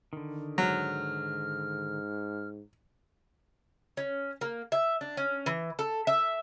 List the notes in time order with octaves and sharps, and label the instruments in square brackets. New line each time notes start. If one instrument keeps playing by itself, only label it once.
[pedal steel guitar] D3 D#3
[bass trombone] G#2 [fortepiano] F#3 [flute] F6
[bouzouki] C#4
A#3
E5
D4
C#4
E3
A4
E5